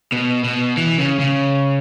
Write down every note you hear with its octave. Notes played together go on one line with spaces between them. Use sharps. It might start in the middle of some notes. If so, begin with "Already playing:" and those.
B2
B2
E3
C#3
C#3